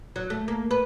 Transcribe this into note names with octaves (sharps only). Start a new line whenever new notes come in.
F#3
A3
A#3
B4